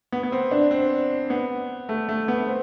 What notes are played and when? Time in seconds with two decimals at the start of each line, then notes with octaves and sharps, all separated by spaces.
0.12 B3
0.23 B3
0.32 C4
0.51 D4
0.71 C4
1.30 B3
1.89 A3
2.09 A3
2.28 B3
2.47 C4